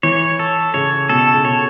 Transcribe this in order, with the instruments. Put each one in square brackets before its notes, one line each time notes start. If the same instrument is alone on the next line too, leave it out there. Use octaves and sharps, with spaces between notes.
[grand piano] E3 [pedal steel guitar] C#5
[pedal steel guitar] A4
[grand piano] C#3 [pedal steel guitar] C#5
[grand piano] B2 [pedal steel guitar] A4
[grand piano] C#3
[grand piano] B2 [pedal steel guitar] C#5